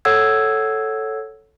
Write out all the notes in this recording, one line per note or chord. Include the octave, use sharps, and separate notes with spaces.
A4 C#5 F#5 E6 G#6